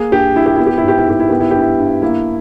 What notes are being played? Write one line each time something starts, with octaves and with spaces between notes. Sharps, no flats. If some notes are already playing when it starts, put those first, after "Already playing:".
Already playing: A#3 G#4
G2 G4
G2 E4
G4
B3 E4
G4
E4
G#2 G4
E4
G#2 G4
E4
B3 G4
E4
G2 G4
E4
G2
A#3 E4